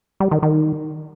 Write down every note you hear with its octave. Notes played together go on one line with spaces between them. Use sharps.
G3
D#3
D#3